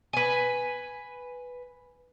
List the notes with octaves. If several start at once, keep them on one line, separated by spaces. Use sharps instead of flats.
B4 G#5